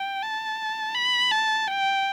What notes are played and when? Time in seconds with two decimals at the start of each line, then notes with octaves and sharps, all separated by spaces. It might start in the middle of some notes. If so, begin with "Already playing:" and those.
Already playing: G5
0.22 A5
0.95 B5
1.31 A5
1.68 G5